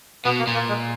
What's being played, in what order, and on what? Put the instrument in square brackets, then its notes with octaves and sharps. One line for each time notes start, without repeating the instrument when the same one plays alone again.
[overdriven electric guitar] B2 [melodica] B3
[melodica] A#3
[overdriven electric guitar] A#2
[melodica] A#3
G#3